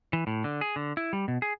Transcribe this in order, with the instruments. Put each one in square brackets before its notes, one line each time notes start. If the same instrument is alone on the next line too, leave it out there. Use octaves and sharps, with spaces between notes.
[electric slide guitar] E3
A2
D3
G#4
D3
E4
G3
B2
G#4